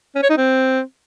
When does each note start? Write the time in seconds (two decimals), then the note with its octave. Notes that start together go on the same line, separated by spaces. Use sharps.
0.15 C#4
0.23 C#5
0.30 D#4
0.37 C4